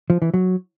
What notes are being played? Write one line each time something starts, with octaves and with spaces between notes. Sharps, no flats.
F3
E3
F#3